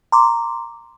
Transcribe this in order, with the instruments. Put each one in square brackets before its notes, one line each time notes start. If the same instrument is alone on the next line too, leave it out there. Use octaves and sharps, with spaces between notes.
[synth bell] A#5 C6 D6